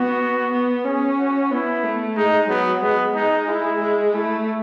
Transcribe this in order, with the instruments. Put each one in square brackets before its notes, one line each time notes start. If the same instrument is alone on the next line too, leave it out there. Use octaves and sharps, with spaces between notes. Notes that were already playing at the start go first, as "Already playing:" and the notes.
Already playing: [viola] B3 [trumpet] F#4
[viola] B3
[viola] C#4 [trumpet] G#4
[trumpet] F#4
[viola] B3 [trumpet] E4
[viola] A3
[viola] G#3 [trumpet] D#4
[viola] F#3 [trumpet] B3
[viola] G#3 [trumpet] B3
[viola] G#3 [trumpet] D#4
[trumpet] E4
[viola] G#3
[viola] A3 [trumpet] E4